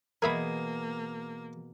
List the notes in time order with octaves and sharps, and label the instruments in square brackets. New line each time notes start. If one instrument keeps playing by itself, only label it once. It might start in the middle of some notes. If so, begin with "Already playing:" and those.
[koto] B2 G#4 [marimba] E3 [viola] A#3 [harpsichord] A#4 E5 B5